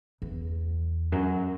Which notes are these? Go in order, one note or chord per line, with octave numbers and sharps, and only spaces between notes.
E2
F#2